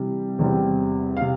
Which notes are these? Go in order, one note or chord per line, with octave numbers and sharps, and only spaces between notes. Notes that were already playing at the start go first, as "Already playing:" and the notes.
Already playing: C3 E3 G3
E2 C3 G3 C4
F5
C3